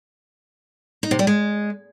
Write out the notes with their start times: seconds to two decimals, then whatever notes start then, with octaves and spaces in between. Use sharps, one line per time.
1.03 D#4
1.11 C3
1.19 G3
1.27 G#3